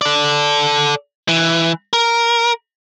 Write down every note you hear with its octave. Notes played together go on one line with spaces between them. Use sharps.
A4 D5
E3
A#4